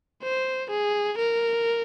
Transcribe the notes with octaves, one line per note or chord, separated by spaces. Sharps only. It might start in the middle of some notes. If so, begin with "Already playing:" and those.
C5
G#4
A#4